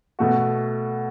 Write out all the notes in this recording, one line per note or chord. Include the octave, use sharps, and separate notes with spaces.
B2 A3 F#4